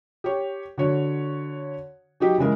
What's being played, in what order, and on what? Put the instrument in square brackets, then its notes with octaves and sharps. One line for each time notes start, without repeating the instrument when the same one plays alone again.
[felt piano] G4 C#5
D3 F#4 C#5
F#3 D#4 G4
C#3 E3 G#3 A#4